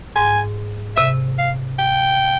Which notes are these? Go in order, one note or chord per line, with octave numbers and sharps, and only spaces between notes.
G#2 G#5
C3 E5
F5
G5